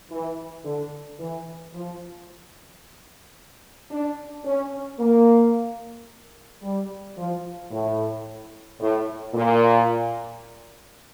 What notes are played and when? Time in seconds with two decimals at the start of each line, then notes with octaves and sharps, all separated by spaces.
0.10 E3
0.65 D3
1.19 E3
1.74 F3
3.91 D4
4.45 C#4
5.00 A#3
6.62 G3
7.17 F3
7.71 A2
8.80 A2
9.34 A#2